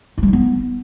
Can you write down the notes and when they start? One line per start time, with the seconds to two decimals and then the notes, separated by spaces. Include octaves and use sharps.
0.18 E4
0.23 G3
0.28 D#4
0.33 B3